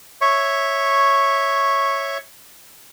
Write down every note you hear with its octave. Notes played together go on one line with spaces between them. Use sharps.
C#5 E5 C#6